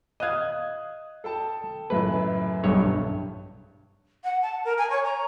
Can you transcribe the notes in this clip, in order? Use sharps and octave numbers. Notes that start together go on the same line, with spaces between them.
D#5 F5 D#6 F#6 G#6
A4 G5 A5
C#2 F#2 A2 B4
B1 G2 C#5
F#5
A5
A#4
G#5
C#5
A#5